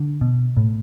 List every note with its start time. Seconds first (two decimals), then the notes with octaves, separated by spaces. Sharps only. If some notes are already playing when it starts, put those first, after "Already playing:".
Already playing: D3
0.21 B2
0.57 A2